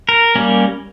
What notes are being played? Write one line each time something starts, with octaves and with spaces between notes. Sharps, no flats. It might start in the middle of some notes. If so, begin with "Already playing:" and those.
A#4
G3 A#3 C#4